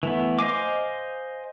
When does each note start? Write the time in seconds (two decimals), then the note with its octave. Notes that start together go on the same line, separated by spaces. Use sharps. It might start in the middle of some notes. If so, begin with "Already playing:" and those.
0.03 E3 A3 B3
0.39 C5 D#5 F5 G#5 D6